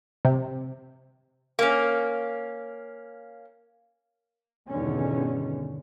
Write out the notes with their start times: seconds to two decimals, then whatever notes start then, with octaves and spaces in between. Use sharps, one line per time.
0.25 C3
1.59 A#3 C#4
4.68 G1 E2 B2 D3 D#3 C#4